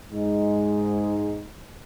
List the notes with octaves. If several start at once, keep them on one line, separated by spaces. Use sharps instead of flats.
G#2 G#3 D#4